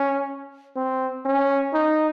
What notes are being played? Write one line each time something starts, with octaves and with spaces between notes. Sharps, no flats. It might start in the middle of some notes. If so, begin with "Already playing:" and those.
Already playing: C#4
C4
C#4
D#4